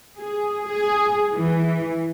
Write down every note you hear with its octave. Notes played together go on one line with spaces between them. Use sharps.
G#4
G#4
E3